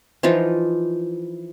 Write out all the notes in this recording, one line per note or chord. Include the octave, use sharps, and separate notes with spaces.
E3 F3 D#4 F4